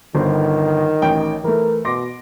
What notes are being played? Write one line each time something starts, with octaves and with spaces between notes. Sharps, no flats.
G1 D3 D#3 C5
A1 G5
E3 A3 A#4
B2 C6 D6 A#6